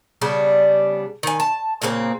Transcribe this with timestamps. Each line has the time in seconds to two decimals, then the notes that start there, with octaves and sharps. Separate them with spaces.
0.21 C#3 G3 B3 D4
1.23 D#3 G#5
1.40 A5
1.82 A#2 C#3 A#3 C4